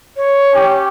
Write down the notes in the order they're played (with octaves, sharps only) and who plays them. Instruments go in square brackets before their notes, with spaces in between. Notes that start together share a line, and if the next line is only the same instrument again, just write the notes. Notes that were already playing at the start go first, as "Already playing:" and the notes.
[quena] C#5
[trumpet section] C#4 G4